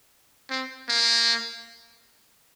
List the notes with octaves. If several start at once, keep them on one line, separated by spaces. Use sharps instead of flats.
C4
A#3